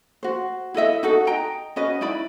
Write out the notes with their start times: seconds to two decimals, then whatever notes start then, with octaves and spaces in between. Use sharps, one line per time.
0.23 F#4 C5
0.74 E4 A4 D#5 E5
1.03 D#4 F#4 A4
1.27 D#5 G5 A#5
1.76 C#4 F#4 B4 D#5
2.01 D#4 E4 D5 B5